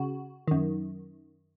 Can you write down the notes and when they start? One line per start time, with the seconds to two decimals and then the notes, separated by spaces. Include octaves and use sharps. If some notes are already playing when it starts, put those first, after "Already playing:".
Already playing: C#3 F#4
0.48 F#2 D#3